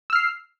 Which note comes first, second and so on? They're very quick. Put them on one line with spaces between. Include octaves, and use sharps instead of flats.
E6 F6 C7